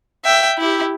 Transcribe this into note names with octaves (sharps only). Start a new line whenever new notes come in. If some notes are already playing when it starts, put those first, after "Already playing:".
E5 G5
E4 G4